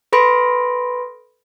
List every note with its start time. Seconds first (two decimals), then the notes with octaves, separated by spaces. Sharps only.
0.13 A4 B4 B5 C6 A#6 D7